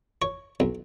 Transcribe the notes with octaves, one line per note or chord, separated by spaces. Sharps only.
C#5
B1